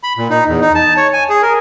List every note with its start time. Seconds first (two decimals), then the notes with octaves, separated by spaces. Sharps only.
0.03 B5
0.18 A#2
0.30 D#4
0.47 E2
0.61 D#4
0.75 A5
0.97 C#5
1.13 G#5
1.29 G#4
1.42 A#4